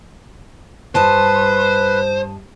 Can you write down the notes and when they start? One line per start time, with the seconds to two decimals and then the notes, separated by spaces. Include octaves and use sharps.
0.95 G2 B4 C5 D#5 A5